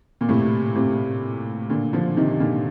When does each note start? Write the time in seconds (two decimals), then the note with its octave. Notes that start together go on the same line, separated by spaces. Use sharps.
0.21 A#2
0.28 A2 C3
0.75 A2 C3
1.70 A#2 D3
1.93 D3 F3
2.17 C3 D#3
2.40 A#2 D3